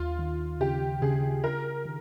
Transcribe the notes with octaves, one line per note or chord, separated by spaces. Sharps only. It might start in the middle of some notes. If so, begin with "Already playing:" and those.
Already playing: D#2 F4
D#3
C#3 G4
C#3 G#4
F4 A#4
D#3